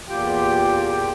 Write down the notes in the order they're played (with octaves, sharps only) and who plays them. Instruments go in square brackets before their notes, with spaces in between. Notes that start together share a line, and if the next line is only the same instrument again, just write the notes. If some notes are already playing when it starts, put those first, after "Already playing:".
[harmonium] E2 A#2 F4 G4 G5